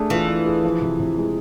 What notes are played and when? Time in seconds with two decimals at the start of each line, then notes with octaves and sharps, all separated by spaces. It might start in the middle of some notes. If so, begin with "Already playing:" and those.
Already playing: A3 D4 G#4
0.10 E3 F4
0.28 D4
0.46 G#4
0.64 F3
0.81 C3
1.00 C3
1.18 G#3